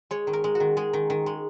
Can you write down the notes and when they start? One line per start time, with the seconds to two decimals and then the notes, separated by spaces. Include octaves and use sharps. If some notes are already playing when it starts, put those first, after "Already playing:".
0.11 G#3 C#5
0.27 D#3
0.33 A#4
0.44 G#3
0.55 F#4
0.60 D#3
0.77 G#3 G#4
0.93 D#3
1.10 D#3
1.26 G#3